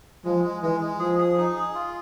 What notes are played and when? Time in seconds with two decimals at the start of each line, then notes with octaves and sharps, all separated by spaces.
0.24 F3 G#3
0.44 G#3
0.62 E3 G#3
0.81 G#3
0.99 F3 G#4
1.18 G#4
1.38 D#4
1.56 G#4
1.75 F4